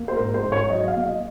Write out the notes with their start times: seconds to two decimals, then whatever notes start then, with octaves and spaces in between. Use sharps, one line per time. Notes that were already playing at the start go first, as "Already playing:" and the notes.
Already playing: A#3
0.08 C5
0.16 G#2 A#4
0.34 C5
0.43 G#2
0.52 C#5
0.70 F#3 D#5
0.83 D#5
0.88 F5
0.96 A#3
1.06 D#5